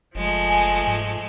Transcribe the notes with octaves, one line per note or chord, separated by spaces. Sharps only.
F#1 F3 G#3 A3
G#5
G#2